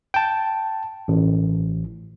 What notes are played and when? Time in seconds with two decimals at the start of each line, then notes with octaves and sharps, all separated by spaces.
0.14 G5 A5
1.08 A1